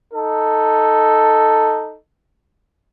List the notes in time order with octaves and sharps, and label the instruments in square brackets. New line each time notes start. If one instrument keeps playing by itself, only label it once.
[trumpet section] D#4 A4